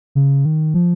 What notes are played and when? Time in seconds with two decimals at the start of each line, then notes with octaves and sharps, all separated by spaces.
0.15 C#3
0.45 D#3
0.74 F3